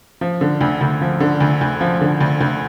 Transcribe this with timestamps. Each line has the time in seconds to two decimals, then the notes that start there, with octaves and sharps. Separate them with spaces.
0.21 F3
0.41 D3
0.61 D2
0.81 D2
1.01 F3
1.20 D3
1.41 D2
1.61 D2
1.81 F3
2.01 D3
2.21 D2
2.41 D2